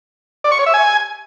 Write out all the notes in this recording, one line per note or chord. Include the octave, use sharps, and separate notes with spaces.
D5
C#6
C#5
E5
G#5